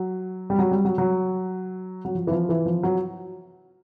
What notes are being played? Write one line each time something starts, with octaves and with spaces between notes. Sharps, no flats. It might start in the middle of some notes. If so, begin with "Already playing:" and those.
Already playing: F#3
G3
F#3
G3
F#3
F#3
F#3
F3
E3
F3
E3
F3
F#3